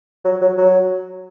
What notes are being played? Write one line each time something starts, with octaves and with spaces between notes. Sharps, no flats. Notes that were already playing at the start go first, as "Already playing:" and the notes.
F#3
F#3
F#3